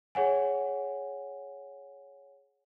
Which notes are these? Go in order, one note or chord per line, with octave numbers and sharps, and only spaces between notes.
G#4 C#5 F#5 G#5